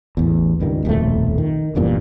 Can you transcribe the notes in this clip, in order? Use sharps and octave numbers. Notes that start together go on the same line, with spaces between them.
A1 E2
C#2 G2 D#3
D#1 B1 F2 A3
D#3
F#1 E2 G2 A#2